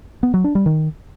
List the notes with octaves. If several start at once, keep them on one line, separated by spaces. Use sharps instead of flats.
B3
F#3
D4
G3
D#3